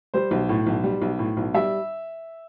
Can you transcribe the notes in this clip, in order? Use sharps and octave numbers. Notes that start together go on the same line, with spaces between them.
G3 C5
B1
A2
B1
G3
B1
A2
B1
G3 E5